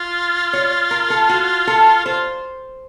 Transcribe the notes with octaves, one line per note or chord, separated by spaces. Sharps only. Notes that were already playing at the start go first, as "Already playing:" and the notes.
Already playing: F4
C#5
A#4
A4
F#4
A4
F4 C5